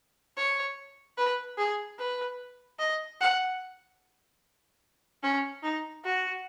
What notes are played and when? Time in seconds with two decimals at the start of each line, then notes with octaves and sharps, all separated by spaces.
0.37 C#5
1.17 B4
1.58 G#4
1.99 B4
2.79 D#5
3.21 F#5
5.23 C#4
5.63 D#4
6.04 F#4